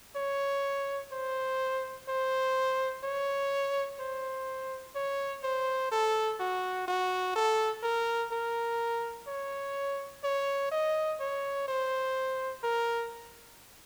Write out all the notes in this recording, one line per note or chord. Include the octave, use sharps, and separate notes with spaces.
C#5
C5
C5
C#5
C5
C#5
C5
A4
F#4
F#4
A4
A#4
A#4
C#5
C#5
D#5
C#5
C5
A#4